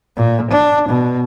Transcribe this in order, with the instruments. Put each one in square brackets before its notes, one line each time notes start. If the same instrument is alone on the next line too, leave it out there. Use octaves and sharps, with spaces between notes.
[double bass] A#2
D4
B2